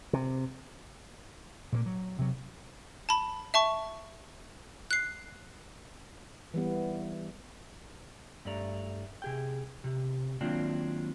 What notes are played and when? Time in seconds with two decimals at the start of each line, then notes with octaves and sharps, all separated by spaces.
0.13 C3
1.72 A#2 A3 A#3
1.86 F#3
2.19 C3 F#3
3.09 A5 B5
3.54 E5 A5 C#6
4.91 F#6 C7
6.54 E3 G3 B3
8.45 G2 A3 D5 A#5
9.22 C3 G#4 G5
9.84 C3
10.41 D#3 F#3 A#3 C4 D4 F4